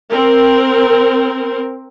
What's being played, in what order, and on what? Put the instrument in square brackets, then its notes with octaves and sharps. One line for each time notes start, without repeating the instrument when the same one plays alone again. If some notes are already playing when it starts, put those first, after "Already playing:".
[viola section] C4 A#4